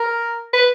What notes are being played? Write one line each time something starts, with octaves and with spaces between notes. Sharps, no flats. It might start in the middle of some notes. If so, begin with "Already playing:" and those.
Already playing: A#4
B4